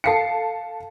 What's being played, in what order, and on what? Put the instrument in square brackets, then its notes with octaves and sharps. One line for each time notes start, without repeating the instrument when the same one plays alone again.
[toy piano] A4 F5 G5 [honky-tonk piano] A5 C7 C#7